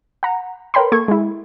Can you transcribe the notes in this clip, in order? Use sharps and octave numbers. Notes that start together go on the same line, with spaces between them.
F#5 A#5
A#4 B4 C#5 G5 B5 C6
A#3 A4 C#6 G#6
G#3 E4